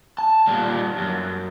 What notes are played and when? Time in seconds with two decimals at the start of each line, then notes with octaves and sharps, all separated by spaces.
0.18 A5
0.47 A#2 G3
0.98 F#2